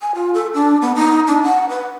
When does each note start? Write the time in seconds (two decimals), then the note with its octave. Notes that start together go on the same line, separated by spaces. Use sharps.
0.01 G#5
0.15 F4
0.34 A4
0.54 D4
0.82 B3
0.95 D#4
1.27 D4
1.43 F#5
1.69 B4